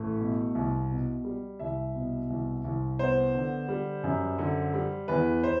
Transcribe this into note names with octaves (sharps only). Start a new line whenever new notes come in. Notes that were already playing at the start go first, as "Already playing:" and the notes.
Already playing: A1 A3
B2
C2
B2
G3
C2 E5
B2
C2
C2
B3 C5
D3
G3
F#2
D3
G3
E2 B4
C5